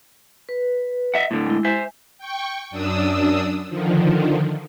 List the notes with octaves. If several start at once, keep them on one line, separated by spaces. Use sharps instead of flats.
B4
D#5 E5 F#5
A2 D3
G#3 E4
C5 E5 G#5
G5 C#6
F#2 D4 D#6 E6
D3 D#3 F3